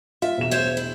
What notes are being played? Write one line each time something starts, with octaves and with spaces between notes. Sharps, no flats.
F4 E5
E1 E7
C5 C#5 E5
E4